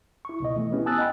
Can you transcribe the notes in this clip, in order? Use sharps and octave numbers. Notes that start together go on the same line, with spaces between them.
E4 C#6
C#2 B2 D#5
E3 A3
B3 C#4 E4 G4
G#5 A5 D#6 E6 F#6 A6
D#5 F#5 G5 B5